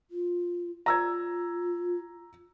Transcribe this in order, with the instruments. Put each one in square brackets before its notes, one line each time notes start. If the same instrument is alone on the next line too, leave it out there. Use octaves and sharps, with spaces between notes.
[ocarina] F4
[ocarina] F4 [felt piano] A#5 E6 G#6